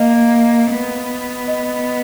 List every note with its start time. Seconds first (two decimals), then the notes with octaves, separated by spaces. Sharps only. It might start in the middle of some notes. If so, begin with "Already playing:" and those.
Already playing: A#3 D#5
0.71 B3
1.48 D#5